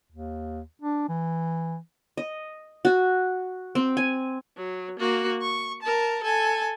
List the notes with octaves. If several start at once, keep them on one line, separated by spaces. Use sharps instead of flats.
D#2
D4
E3
D#5
F#4
C4
G#5
F#3
A#3 F#4
C#6
A#4 A5
A4 G#5